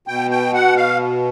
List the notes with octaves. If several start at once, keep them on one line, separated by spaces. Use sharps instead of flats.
B2 G5
G5
F#5
F5